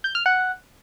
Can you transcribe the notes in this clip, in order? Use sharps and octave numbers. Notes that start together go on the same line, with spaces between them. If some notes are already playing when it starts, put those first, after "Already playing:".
G6
F6
F#5